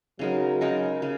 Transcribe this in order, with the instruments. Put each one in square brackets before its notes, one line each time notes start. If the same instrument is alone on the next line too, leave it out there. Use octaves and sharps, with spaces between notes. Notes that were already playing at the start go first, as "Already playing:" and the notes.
[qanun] C#3 G#3 D#4 A#4 [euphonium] F#3
[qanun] C#3 G#3 D#4 A#4
C#3 G#3